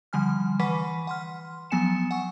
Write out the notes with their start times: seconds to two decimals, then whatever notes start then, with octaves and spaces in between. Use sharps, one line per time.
0.13 D3 F3 G3 G#5 F6
0.59 E3 B4 F#5 B5 C#6 B6
1.07 F#5 C6 F6
1.71 F3 F#3 B3 G#5 C#7 E7
2.11 F#5 G#5 C#6